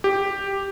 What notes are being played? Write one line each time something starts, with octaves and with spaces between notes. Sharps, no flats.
G4